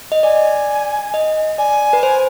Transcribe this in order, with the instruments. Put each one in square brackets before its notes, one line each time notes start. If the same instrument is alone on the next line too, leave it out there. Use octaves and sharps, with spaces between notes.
[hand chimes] D#5
[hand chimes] D5 [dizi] G#5
[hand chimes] D#5
[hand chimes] D5 [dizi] G#5
[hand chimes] B4
C5